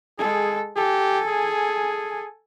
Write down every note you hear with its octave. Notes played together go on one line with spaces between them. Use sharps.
G#3 G#4 A4
G4 A4 G#5
G#4